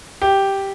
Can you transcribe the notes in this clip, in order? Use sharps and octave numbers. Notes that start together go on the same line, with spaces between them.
G4